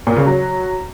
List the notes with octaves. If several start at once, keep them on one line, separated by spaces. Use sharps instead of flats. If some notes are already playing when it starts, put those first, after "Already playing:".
A#2
C#3
F#3